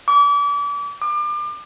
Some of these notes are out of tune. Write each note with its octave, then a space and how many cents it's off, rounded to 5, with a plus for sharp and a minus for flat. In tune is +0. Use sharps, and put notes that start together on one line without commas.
D6 -35
D6 +35